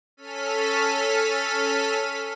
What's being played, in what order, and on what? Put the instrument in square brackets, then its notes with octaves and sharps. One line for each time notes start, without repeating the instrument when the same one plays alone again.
[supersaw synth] C#4 A4 F6 B6 D#7